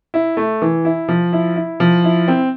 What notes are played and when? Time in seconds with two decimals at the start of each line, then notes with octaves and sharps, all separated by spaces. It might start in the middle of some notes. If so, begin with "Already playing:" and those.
0.14 E4
0.37 A3
0.62 E3
0.85 E4
1.08 F3
1.33 E4
1.56 E4
1.80 F3
2.04 E4
2.28 C4